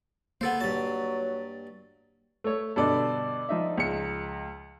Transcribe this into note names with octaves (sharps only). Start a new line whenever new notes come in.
A#3 B3 A4 C5
G2 F#3 A5
A3 C#5
G2 B2 D3 A4 D5
F3 D#4 E5
C#2 C#7